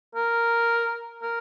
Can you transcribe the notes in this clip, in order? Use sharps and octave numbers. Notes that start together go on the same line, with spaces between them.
A#4
A#4